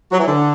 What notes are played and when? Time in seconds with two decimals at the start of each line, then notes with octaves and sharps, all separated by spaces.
0.12 F#3
0.19 E3
0.27 D3